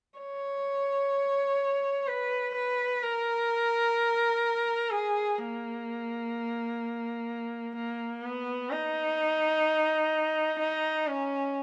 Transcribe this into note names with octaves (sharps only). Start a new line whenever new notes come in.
C#5
B4
B4
A#4
G#4
A#3
A#3
B3
D#4
D#4
C#4